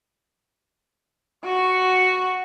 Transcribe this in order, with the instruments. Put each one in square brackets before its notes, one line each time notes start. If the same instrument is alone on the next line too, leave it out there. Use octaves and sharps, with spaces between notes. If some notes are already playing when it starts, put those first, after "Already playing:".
[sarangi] F#4 [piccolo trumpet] C#6